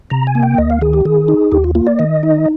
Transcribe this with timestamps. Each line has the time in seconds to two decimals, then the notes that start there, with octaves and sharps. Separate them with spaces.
0.10 C3 A#5
0.27 G#5
0.35 A#3
0.43 G5
0.58 D2 D#5
0.70 F5
0.81 D#3 G#4
0.93 G4
1.05 D#3 G#4
1.28 D#4
1.52 D#2 G4
1.64 F4
1.75 A#3 F4
1.87 D5
1.99 D#3 D#5
2.23 D#4